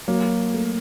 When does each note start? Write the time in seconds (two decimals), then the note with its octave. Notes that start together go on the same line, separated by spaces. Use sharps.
0.08 F#3 A#3
0.54 A3